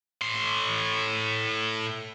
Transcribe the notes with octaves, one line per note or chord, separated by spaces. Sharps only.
A2 C6